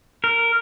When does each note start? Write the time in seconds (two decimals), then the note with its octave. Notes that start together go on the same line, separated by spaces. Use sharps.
0.24 A#4